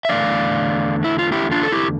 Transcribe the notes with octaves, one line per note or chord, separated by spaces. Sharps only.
E5
E2 D3 A3 D5 F5
E4
F4
E4 G4
D4 F4
A4
E4 G4